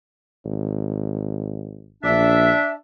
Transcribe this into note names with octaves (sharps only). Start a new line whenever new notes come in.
G#1
A#1 D4 E5